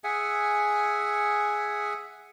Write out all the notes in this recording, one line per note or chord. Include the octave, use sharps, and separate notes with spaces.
G#4 E5 F#5 G#5